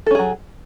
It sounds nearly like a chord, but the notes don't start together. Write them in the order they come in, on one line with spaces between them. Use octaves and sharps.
A4 C#4 G#4 F#3